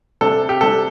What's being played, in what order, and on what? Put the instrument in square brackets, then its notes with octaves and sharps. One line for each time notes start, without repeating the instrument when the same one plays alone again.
[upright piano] C3 G3 D4 A4
G4
C3 G3 D4 A4